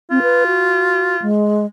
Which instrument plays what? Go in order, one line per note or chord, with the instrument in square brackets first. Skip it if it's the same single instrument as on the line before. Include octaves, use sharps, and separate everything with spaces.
[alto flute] C4 [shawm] F4
[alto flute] B4
F#4
G#3